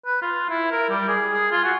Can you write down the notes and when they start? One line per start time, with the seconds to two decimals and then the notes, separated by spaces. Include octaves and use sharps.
0.06 B4
0.22 F4
0.49 E4
0.71 A#4
0.90 G3
1.08 G#4
1.31 G#4
1.52 F4
1.64 F#4